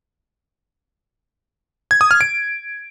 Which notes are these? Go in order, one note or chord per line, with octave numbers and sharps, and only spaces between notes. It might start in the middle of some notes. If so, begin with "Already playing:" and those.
G#6
D#6
F6
D7